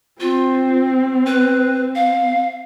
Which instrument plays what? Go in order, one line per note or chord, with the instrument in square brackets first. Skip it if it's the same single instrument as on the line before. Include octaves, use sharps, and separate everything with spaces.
[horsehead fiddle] C4 [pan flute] F4
[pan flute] B4
F5